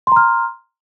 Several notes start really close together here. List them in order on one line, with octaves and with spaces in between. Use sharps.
C6 A#5 F6